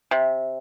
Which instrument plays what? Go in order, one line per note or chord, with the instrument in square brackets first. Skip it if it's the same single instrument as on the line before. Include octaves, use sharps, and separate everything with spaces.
[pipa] C3